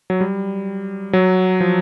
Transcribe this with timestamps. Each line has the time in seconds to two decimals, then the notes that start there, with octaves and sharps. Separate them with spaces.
0.10 F#3
0.21 G3
1.13 F#3
1.60 F3